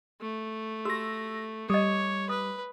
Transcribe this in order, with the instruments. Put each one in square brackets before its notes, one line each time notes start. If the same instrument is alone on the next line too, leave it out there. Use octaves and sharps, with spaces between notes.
[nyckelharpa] A3
[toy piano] F#4 G4 [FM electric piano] E6 A#6
[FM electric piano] G3 [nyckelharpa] C#5 [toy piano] D#5 D#6
[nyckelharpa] B4 [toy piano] D#6